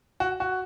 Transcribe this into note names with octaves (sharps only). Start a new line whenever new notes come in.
F#4
F#4